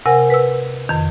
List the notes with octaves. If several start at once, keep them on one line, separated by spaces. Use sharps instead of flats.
C3 A#4 F#5 G#5
B4 E6
F2 D#3